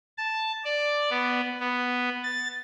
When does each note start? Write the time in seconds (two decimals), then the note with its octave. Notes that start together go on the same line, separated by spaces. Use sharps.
0.18 A5
0.65 D5
1.10 B3
1.60 B3
2.24 A6